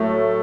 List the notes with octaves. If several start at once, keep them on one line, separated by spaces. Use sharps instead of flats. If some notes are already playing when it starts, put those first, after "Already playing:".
Already playing: A2 F#3 A3